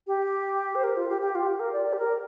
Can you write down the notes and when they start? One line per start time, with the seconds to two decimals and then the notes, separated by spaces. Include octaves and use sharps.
0.07 G4
0.75 C5
0.84 A#4
0.96 F4
1.09 G4
1.22 G4
1.35 F4
1.47 G4
1.60 A#4
1.73 D5
1.86 D5
1.93 G4
1.99 A#4